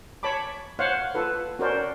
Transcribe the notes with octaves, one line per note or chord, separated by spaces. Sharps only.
C#5 A5 B5 D6
C5 C#5 F5 F#5
F4 A4 B4
C#4 F#4 A#4 C5 D5